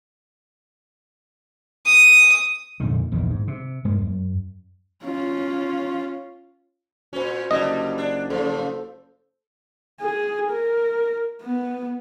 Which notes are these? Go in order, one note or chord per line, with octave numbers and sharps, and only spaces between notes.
D#6
F2 A#2 D3 D#3
A#1 E2 G2 D#3
G#2
C3
G2 G#3 A#3
F#2
C#4 F4
A#2 C#4 F#4 C5
F#1 D3 G3 D#5
D4
C#3 F3 A4 C5
G#4
A#4
B3